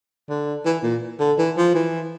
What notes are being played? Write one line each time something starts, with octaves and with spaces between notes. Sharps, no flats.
D3
E3
A#2
D3
E3
F3
E3